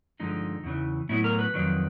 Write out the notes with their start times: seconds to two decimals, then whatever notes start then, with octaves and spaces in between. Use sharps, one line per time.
0.20 G2 D3 F3 G#3 D#4
0.64 E2 C#3 E3
1.09 A2 F#3 B3 E4
1.24 A#4
1.39 B4
1.54 F2 C3 D#3 F#3